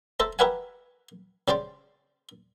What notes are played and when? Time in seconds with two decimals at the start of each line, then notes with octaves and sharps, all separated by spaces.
0.20 A4 C5 E5 A#5
0.39 G4 A#4 B4 E5 F#5 G#5
1.48 C#3 G4 C5 D5 G5 C6